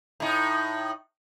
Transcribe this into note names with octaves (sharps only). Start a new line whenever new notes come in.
A2 D#4